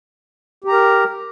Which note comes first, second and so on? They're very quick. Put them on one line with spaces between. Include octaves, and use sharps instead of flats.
G4 A#5 A#4